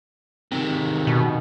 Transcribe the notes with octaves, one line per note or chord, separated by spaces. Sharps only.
C3 D#3
B2